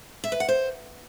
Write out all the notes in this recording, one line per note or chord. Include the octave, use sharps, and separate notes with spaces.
E5
B4
F#5
C5